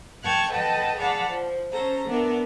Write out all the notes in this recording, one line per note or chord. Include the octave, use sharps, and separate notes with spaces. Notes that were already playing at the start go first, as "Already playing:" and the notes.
G5 A5 C#6 F6 F#6 G#6
A4 B4 D#5 F#5 G5 A5
G#4 D5 F5 F#5 A5 B5
F3
C#4 A4 C5 A#5
B3 D4 A#4 E5